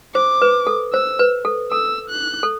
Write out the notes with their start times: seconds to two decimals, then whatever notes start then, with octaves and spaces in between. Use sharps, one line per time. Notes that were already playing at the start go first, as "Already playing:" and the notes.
0.15 C5 D6
0.42 B4
0.67 A4
0.93 C5 E6
1.19 B4
1.45 A4
1.71 A4 E6
2.10 F#6
2.43 A4